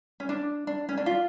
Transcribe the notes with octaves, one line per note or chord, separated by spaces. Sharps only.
C#4
D4
D4
C#4
D4
F4